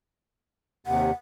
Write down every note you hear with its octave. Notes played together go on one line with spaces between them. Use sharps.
D#2 C3 F#5